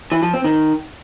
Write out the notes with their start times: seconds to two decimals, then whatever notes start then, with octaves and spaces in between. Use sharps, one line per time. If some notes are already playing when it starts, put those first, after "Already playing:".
0.12 E3
0.22 F3
0.33 C4
0.44 D#3